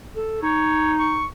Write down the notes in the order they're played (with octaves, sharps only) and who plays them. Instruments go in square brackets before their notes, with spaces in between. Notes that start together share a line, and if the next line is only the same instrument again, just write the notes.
[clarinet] A4
[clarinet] D#4 [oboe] C#5
[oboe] C#6